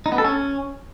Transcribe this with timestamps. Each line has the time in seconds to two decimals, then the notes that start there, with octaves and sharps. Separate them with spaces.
0.06 D#4
0.12 B3
0.18 A4
0.25 C#4